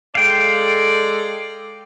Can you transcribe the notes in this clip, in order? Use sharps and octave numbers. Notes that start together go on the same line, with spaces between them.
G#3 A4 D5 F5 G5